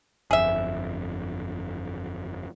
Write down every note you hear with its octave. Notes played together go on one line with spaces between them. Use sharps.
G1 F2 G#4 E5